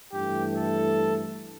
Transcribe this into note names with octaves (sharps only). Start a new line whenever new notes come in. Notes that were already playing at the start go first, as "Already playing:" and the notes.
G2 E3 A3 G4
A4